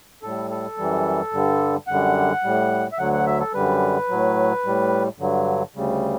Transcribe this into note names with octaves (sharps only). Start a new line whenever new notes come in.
A2 G3 A4
A4
F#2 E3 G3
G2 D3 G3
F#2 D3 G3 F#5
A2 G3
E5
D2 D3 F#3 F#5
F#5
E5
A4
F#2 D3 G3 B4
A2 F#3
A2 G3
G2 D3 F#3
D2 C#3 G3